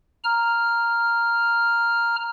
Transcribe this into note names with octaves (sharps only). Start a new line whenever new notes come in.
A#5 F6